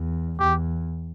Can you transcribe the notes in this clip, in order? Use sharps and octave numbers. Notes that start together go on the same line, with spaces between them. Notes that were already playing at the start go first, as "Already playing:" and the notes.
Already playing: E2
E2 G4